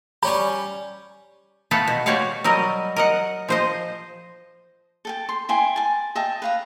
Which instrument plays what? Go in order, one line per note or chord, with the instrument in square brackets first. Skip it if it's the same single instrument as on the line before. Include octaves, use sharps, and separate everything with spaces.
[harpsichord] G3 C#4 G4 [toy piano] B5
[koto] A3 B3 A4 F5 F#5
B2
F#4 G4 C#5 D5 F5 F#5
F#3 G3 A#4 D#5
A#4 D#5 F#5
F3 C5 D#5
[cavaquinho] A4 G5 A5
C6
E4 G5 G#5 C6
G#5 A5
D#5 E5 G5 A5
B4 F5 A#5